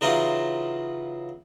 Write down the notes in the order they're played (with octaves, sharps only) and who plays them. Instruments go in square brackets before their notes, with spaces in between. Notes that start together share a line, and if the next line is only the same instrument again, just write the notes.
[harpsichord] C#3 E3 F#3 D#4 F4 F#4